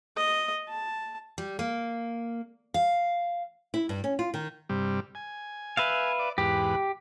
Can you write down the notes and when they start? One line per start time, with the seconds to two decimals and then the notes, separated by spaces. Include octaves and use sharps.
0.17 D#5
0.69 A5
1.38 G3
1.59 A#3
2.74 F5
3.74 E4
3.89 G2
4.04 C#4
4.19 F4
4.34 D#3
4.69 G2 C3 G3
5.15 G#5
5.77 B4 E5 F5
6.19 D5
6.38 E2 G#2 G4 B4